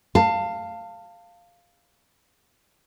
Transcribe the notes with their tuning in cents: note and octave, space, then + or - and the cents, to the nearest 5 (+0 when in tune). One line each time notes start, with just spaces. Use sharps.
F5 +0 A5 +25